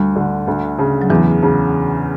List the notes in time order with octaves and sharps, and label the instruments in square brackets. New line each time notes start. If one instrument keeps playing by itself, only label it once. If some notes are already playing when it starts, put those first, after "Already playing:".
Already playing: [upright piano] D2 [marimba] G3
[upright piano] D3
D2
C#3
[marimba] F#3
[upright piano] E2 [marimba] E3
[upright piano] C#3